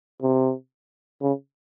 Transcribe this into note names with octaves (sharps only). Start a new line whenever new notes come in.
C3
C#3